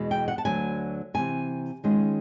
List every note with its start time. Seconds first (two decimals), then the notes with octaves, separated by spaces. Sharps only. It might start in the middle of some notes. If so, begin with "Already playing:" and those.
Already playing: E2 B2 G#3
0.11 G5
0.28 F#5
0.38 A5
0.45 D2 D3 F#3 G#5
1.14 E2 C3 E3 G#5
1.84 D#3 G#3 C#4 F4